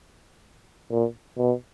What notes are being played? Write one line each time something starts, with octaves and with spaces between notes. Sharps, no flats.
A#2
B2